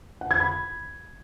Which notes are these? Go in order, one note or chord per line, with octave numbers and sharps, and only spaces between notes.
F#5
G#6
B5